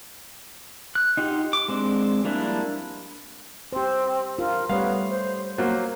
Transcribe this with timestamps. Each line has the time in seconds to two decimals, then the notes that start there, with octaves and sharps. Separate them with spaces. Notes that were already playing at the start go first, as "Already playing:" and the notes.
0.95 F#6
1.17 D#4 F4 G4 F#5
1.53 D6
1.68 G#3 C4 D4
2.24 F3 G3 A#3 D4 E4
3.73 C4 G4 C5
4.39 D4 F4 A#4
4.69 G3 A3 B3 C#5 F5
5.10 C5
5.58 F#3 A#3 C5